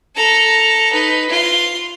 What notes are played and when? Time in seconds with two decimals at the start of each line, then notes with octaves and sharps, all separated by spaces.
0.15 A4 A#5
0.92 D#4 B4
1.30 F4 C6